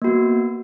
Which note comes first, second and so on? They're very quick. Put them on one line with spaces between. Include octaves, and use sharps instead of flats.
A#3 F#4 B3